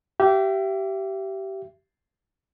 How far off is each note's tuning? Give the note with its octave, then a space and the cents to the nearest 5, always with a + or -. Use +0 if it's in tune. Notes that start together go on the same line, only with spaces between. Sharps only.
G4 -20 E5 +35